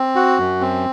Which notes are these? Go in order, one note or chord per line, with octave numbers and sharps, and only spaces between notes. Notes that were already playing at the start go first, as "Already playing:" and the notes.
Already playing: C4
F#4
F#2
C4